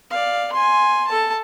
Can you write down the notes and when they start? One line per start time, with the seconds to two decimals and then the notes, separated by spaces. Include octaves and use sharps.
0.10 D5 F5
0.52 G#5 C6
1.07 A4 A5